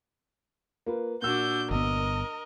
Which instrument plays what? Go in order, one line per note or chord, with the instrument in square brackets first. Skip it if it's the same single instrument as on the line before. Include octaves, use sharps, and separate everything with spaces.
[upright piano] A#3 F4 B4
[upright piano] A#2 E6 [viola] D4 F#4 [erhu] G6
[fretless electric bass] G1 B3 [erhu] A#4 [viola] D#5